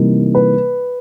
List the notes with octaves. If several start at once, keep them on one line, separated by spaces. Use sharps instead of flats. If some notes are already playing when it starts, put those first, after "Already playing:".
Already playing: C3 E3 G3 A#3 D#4
B4